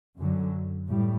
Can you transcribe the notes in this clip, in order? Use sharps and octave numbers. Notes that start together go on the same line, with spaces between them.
F#2 D3 F#3
A2 G3